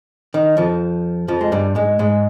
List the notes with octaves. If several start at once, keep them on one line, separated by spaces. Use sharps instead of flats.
D#3
F2 F3
F2 F3
G#3
G2 G3
G#2 G#3
G#2 G#3